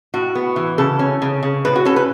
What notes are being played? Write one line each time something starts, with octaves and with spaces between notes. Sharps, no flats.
A2 F#4
B3
E3
C#3 A4
C#4
C#3
C#3
A2 B4
F#4
C#4 A4
B4